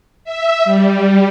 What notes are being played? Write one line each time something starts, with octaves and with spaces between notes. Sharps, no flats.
E5
G3